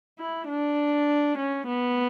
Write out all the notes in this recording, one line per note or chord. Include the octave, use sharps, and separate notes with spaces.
E4
D4
C#4
B3